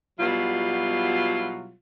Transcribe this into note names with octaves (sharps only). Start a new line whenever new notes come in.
B2 F#3 G3 E4 F4